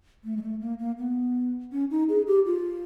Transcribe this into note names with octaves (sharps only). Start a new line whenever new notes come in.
A3
G#3
A3
A#3
A#3
B3
C#4
D#4
G#4
G4
F4